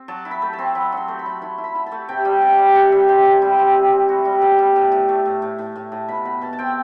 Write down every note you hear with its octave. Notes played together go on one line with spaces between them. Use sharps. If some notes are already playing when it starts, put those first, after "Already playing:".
Already playing: C4
F#3 A5
E4
B5
A3
A5
C4
F#3 B5
F#3 C6
A3
B5
F#3
E4 C6
E4
B5
E4
A5
A3
C3 G5
G3
C3
G3
C3 F#5
G3 E5
C3 C5
C3
G3 E4
C4
C4
C4
E4 F#4
G3
B2 A4
G3
A2
A2
A3
A2
A2
A2
A2
A2
B2 B5
B2 B5
B2 A5
A5
C4 G5